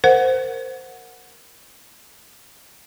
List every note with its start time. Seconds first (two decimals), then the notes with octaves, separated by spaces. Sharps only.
0.04 A#4 C5 F#5